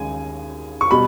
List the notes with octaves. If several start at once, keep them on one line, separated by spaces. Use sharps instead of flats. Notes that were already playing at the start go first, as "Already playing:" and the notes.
Already playing: D#2 C#3 G#3 G#5
C#6
B2 G3 B5